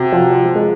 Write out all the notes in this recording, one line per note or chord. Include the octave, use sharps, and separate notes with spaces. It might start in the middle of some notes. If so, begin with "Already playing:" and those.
Already playing: C3 F#4
F3
G#3